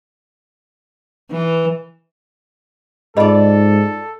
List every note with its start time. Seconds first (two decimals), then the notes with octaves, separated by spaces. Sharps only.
1.31 E3
3.17 G#2 F4 G#4 A4 D5 D#5 B5